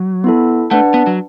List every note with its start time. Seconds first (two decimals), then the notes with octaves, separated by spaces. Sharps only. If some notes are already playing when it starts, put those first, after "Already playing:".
Already playing: F#3
0.24 B3 E4 A4
0.71 A3 D4 B4 D5 F#5 A5
0.94 B3
1.07 F#3